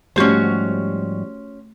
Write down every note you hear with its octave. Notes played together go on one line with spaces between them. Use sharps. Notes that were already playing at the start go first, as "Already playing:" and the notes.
G#2 F3 G3 A3 C#4 F#4 G4 C5